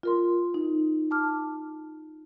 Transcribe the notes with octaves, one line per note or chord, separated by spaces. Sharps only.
F4 A#4 C6
D#4
A5 D6 F6